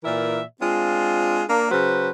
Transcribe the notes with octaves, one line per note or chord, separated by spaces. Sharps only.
A#2 E3 A#4 D5 E5
G#3 C4 D4 F4
A#3 D4
C#3 F#3 B4 C5